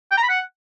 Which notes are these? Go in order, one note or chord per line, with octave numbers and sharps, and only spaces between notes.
G5
A#5
B5
F#5